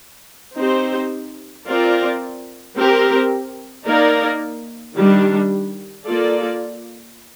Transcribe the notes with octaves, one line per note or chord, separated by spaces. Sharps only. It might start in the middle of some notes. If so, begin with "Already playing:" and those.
C4 D#4 G4 C5
C4 F4 A#4 D5
C4 G4 A#4
A#3 D#4 A#4 D5
D#3 G3 D4
A#3 F4 A4 D5